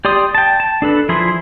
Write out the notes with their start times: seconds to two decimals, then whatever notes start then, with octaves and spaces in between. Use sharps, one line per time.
0.05 G4 D5 C6 D#6
0.35 G5 A5
0.60 A5
0.82 D4 A4 B4
1.09 F3 E4 G#4 C6